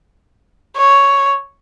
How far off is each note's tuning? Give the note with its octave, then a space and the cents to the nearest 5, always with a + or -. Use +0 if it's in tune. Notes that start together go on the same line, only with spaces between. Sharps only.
C#5 +5